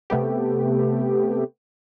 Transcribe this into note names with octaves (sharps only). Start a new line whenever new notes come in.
C3 A3 B3 G4